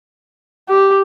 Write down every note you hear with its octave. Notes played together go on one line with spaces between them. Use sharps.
G4